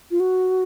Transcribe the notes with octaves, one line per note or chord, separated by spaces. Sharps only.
F4
F#4